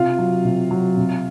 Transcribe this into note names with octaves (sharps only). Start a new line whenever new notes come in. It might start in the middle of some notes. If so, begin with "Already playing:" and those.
Already playing: C3 F4 F5
F#3
C3
F#3
C3